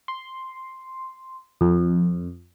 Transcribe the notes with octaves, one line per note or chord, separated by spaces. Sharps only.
C6
F2